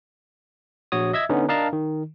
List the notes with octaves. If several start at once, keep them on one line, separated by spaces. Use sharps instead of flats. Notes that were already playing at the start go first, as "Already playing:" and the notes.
A#1 F#4 C#5 D#6
D#5 E5 E6 G#6
D3 B3 C#4 D#4
D4 A#4 D#5 F5 A5 A#5
D#3